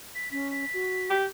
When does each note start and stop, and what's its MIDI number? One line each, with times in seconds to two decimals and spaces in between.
0.15 0.29 95
0.31 0.65 61
0.31 0.48 95
0.51 1.17 95
0.73 1.11 66
1.10 1.25 67